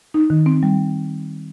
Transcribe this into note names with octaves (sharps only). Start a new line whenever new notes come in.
D#4
D#3
C4
G3